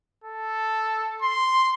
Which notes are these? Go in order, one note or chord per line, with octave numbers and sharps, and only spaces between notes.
A4
C6